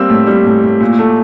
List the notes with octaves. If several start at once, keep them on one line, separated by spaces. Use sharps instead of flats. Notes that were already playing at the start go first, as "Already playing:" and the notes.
Already playing: G3 A#3 C4 E6
A2
G3
A2
A2
A#2
A3